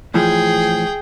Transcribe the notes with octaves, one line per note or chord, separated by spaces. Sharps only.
A2 E3 F3 G#4 G5